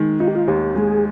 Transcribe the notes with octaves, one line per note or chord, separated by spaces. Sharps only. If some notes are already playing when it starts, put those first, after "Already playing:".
Already playing: D#3 G#3
D#4 F4
G4
F4
D#2 G4
G#3 G#4